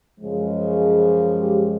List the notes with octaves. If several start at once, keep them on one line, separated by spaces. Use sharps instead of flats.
F#2 C#3 F3 G#3
G4